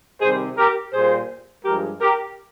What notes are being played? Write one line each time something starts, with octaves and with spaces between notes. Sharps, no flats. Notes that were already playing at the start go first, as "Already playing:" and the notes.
C3 D#3 G3 G#4 C5
G4 A#4
A#2 G3 G#4 C5
G2 F3 G#3 G4 A#4
G4 A#4